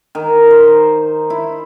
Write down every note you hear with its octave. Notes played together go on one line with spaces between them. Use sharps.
D#3
C5
E4